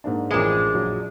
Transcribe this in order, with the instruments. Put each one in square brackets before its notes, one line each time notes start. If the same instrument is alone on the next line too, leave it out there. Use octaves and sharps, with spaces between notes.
[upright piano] G#2 A#3 D4
[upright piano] A1 F3 A#4 [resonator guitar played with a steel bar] G#3 D4
[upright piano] A#1 F#3